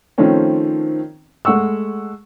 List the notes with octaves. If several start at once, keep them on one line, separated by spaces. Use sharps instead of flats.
D#3 F3 A3 C4 C#4
G#3 A3 F#5 C#6 E6